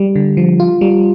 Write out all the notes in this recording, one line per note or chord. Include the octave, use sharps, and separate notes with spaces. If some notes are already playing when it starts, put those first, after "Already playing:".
Already playing: G3
D3
F3
F4
G3